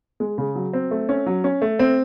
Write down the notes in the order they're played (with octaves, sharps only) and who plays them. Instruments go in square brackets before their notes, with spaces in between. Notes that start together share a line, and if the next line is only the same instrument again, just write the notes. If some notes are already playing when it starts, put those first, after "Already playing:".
[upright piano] G#3
C#3
F#3
C4
A3
C#4
F#3
C#4
A3
C4